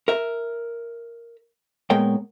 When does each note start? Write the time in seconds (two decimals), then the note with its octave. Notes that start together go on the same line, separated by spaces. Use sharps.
0.08 A#4 E5
1.90 A#2 G#3 B3 A#4 C#5 G5